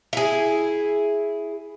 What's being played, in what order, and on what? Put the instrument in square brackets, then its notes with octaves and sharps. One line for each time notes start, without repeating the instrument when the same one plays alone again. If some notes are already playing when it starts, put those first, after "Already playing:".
[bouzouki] E4 G#4